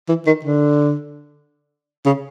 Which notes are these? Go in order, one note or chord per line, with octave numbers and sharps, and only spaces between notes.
E3
D#3
D3
C#3